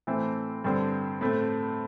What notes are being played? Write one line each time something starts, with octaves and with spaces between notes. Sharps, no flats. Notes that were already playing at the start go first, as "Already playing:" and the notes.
A2 E3 A3 C4
G2 D3 C4
A2 A3 C4